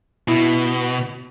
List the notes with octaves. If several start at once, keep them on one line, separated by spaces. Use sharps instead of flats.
B2 E4